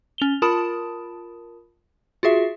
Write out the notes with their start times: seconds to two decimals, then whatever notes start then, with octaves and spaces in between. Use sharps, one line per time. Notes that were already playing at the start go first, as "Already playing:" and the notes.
0.18 C#4 F7 G7
0.42 F4 A#4 A5 B5 D#6 E7
2.23 F4 F#4 G#4 E5